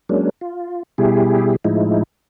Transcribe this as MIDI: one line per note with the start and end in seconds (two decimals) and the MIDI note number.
0.09 0.29 54
0.09 0.29 56
0.09 0.29 58
0.09 0.29 61
0.09 0.29 62
0.41 0.83 65
0.98 1.56 47
0.98 1.56 55
0.98 1.56 64
0.98 1.56 67
0.98 1.56 68
1.64 2.03 45
1.64 2.03 53
1.64 2.03 56
1.64 2.03 63
1.64 2.03 64